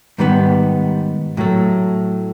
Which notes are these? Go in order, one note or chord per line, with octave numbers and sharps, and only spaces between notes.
G#2 D#3 G3 B3
A2 F#3 A3